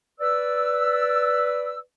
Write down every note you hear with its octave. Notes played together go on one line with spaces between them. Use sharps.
B4 D5 E6